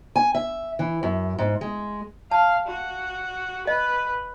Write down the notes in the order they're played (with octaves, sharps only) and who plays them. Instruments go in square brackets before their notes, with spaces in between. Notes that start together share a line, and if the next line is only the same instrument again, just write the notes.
[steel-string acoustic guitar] G#5
E5
E3
F#2
G#2
G#3
[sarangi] F5 [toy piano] A5
[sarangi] F#4
[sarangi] B4 [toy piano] D#5